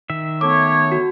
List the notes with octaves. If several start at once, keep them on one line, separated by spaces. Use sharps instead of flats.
D#3 E5
A3 B3 C#5 D6
F#4